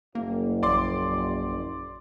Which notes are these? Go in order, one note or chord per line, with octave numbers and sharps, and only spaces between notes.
F#1 A#3
A#1 D5 C6 D6